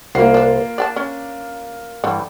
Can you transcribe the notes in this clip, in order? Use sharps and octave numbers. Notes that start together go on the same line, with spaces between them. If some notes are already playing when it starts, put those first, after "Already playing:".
C2 A#3 F4 F#4 C7
D4 B4
D4 D5 G5 A5
C#4
G2 D3 E3 G3